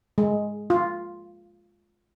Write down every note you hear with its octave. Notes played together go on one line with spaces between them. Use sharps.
G#3
F4